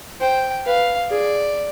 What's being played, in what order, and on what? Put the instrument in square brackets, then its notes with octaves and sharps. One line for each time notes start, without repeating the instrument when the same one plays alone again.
[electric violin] C5 [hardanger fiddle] G5
[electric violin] B4 [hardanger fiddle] F5
[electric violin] G#4 [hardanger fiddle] D5